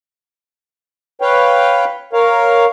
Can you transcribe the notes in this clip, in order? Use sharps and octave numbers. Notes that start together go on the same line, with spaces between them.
B4 C#5 F5 G5
A#4 C#5 F5